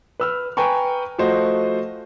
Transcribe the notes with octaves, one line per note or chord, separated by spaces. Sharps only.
B4 E6 F6
B4 G5 G#5 A#5 C#6
F3 A3 F#4 C5 D#5